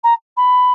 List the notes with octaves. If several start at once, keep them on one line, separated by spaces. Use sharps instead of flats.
A#5
B5